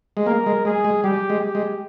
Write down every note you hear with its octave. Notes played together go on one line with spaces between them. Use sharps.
G#3
A#3 A#4
G#3
G#3 G#4
G#3
G3 G4
G#3
G4
G#3